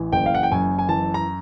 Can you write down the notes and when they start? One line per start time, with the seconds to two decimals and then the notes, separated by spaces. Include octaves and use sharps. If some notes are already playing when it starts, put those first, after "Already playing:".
Already playing: A1 E3
0.12 F#1 G5
0.26 F5
0.35 F#5
0.43 G5
0.52 F#2 G#5
0.78 G#5
0.89 E3 A5
1.14 A#5